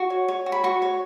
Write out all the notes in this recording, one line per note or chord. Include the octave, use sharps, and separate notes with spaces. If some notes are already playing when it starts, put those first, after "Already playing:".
Already playing: F#4 C#6
C#5
C#5
F#4
B5
F#4 C#6
C#5